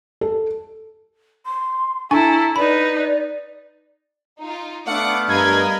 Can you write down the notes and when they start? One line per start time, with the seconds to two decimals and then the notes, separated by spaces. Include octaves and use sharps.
0.21 A4
1.46 C6
2.11 D4 E4 A4 G#5 A#5 C#6
2.56 D#4 B4 D5 B5
4.40 D#4 F4
4.87 A3 B3 D4 F5 F#5 D6
5.29 G2 A#4 D#5 B5 G#6